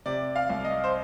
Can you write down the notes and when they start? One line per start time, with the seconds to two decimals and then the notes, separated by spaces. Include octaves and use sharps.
0.06 C3 D5
0.36 F5
0.50 C2
0.64 D#5
0.84 C5